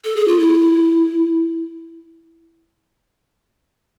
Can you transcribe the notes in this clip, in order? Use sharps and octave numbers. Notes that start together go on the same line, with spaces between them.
A4
G#4
F4
E4